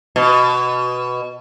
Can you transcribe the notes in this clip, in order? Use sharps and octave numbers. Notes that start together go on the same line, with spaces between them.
B2